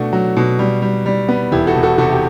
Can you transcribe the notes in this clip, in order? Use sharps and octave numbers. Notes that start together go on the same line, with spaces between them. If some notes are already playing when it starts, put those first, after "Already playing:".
Already playing: B2 A3 D4 F#4
F#3
B2
G3
G3
G3
B3
E1 E4 G4
F#4 A4
E1
F#4 A4
C3 F#4 A4
G4